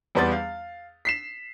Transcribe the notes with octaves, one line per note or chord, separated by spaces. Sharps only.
E2 G3 B3 C6 A6
F5
B6 C7 E7